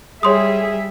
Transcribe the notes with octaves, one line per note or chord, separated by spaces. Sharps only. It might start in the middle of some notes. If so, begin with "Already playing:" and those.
G3 G#4 C#5 E5 C6 D#6